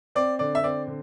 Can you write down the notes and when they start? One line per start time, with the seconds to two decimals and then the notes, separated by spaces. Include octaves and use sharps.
0.15 C4 D5
0.39 D3 D5
0.55 E5
0.64 C4 D5
0.87 D3